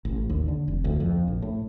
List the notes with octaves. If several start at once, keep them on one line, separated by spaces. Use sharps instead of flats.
A1
D#2
D3
F1
D2
F2
A#1
A2